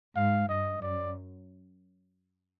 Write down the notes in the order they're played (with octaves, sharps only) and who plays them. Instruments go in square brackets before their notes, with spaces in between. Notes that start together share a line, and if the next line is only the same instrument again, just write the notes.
[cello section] G#2 [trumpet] F5
[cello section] G2 [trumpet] D#5
[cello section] F#2 [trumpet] D5